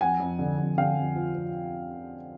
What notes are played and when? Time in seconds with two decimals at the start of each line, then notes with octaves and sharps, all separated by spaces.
0.01 F2 F#5 G#5
0.20 F2
0.39 D3
0.58 F2
0.78 D3 F5 G5
0.97 F2
1.16 F3
1.35 F3